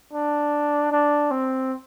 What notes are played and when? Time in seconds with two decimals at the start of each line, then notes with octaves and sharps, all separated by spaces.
0.13 D4
0.92 D4
1.31 C4